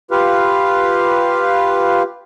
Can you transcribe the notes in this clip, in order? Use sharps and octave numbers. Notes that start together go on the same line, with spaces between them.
F4 G4 B4 F5